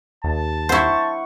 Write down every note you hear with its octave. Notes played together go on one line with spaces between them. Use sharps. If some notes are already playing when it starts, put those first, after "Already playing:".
D#2 A5
E4 C5 F#5 C#6